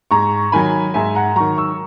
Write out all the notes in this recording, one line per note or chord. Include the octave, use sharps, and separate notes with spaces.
G#2 A#5 C#6
D#3 F#3 G#5 B5
G#2 E5 G#5
F#5 A#5
D#3 F#3 A#5 C#6
C#6 E6